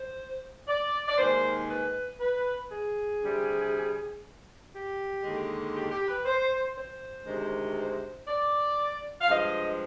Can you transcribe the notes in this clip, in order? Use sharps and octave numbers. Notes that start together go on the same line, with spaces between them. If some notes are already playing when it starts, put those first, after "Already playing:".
Already playing: C5
D5
D5
D#2 D#3 G#3 C5
B4
B4
G#4
D2 C3 G3
G4
D#2 D3 G#3
G4
G4
B4
C5
C5
D2 C3 D#3 G#3
C5
D5
F5
G2 F3 G#3 D#5